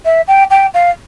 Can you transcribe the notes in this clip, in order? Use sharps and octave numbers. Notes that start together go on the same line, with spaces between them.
E5
G5
G5
F5